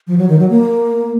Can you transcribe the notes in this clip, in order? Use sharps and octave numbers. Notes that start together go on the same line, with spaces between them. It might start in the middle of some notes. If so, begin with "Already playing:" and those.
F3
F#3
D#3
F#3
A#3